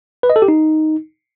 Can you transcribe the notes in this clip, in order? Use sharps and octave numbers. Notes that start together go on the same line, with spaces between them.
B4
D#5
A4
G4
D#4